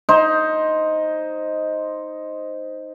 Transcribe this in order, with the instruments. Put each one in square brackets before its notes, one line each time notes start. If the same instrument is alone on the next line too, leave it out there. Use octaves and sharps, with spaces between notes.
[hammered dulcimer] D#4 C5